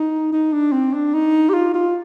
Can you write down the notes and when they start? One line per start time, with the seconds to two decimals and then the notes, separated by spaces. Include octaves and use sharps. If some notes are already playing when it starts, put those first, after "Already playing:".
Already playing: D#4
0.33 D#4
0.53 D4
0.73 C4
0.93 D4
1.14 D#4
1.49 G4
1.54 F4
1.74 F4